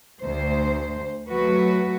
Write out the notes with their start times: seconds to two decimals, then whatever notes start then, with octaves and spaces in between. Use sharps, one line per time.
0.24 D2 C5
1.29 F#3 A3 F#4 B4